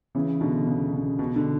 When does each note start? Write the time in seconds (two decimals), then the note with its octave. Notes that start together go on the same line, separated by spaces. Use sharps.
0.15 C#3 E3
0.41 B2 D3
0.67 C#3
0.88 B2
0.94 C#3
1.19 B2
1.36 D3